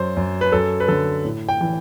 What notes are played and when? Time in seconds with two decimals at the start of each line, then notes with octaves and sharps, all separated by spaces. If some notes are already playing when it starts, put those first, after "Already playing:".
Already playing: F#2 F#3 C5
0.17 F#2
0.41 B4
0.52 F#2 A4
0.80 B4
0.88 D3 A4
1.25 A2
1.49 G5
1.61 E3